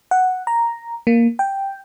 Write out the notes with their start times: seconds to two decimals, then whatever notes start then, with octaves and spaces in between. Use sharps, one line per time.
0.11 F#5
0.47 A#5
1.07 A#3
1.39 G5